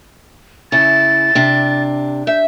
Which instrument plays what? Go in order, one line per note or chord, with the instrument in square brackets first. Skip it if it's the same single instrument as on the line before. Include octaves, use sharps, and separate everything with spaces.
[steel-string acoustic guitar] C#3 E4 [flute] A6
[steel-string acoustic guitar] C3 D4
[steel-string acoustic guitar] E5 [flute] G6